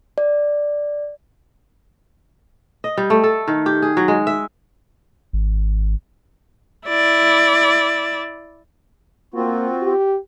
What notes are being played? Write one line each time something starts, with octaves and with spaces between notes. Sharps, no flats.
D5
D#5
G3
A3
A4
D#3
G4
G#4
F#3
G#3
E5
G#1
E4 D5
A#3 C4 F4 F#4
G4